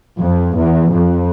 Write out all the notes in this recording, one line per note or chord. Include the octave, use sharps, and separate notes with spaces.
F2
E2
F2